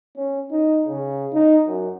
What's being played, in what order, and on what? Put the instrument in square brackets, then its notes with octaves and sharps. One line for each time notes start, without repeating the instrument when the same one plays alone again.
[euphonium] C#4
D#4
C#3
D#4
F#2